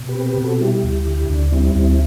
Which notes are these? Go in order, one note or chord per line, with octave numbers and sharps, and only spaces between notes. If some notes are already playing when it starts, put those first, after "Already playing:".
Already playing: B2
G4 B4
C4
G4 B4
B2
F#4 A4
G3 E4 G4
D2
D3
D2 D4
G3 C4 E4
D2 C4 E4